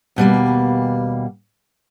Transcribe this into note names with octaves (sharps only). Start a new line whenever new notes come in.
D#2 B2 G3 A#3